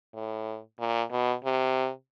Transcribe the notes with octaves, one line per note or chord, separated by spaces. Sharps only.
A2
A#2
B2
C3